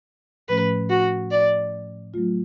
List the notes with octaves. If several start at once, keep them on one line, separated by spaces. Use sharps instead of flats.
A2 F3 A3 C#4 B4
F#4
D5
F#3 A3 F4